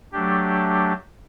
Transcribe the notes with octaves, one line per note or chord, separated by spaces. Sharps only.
F#3 A3 D4 G4